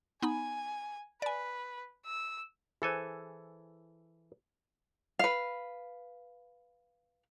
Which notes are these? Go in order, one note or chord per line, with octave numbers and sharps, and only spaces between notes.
B3 D#4 G#5 B5
B4 D5 G#5
E6
E3 G#4 A4 C5 G#5
B4 F5